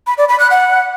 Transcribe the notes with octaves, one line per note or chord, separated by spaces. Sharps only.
B5
D5
B5
F#6
F#5